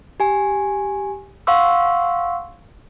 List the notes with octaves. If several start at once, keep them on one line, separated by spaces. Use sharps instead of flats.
G4 G#5
F5 F#5 C6 C#6 E6